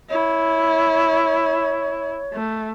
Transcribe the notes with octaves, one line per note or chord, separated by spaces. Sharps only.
E4 C#5
A3